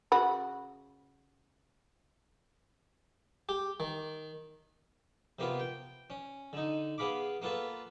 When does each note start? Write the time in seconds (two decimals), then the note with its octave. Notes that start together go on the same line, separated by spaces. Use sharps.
0.12 C#3 F#4 B5
3.49 G4
3.80 D#3
5.39 C3 A#3 B3 F4
5.60 G5
6.10 C#4
6.53 D3 D#4
6.98 B3 G#4 F5 B5 D6
7.42 A#3 B3 F4 A4 B4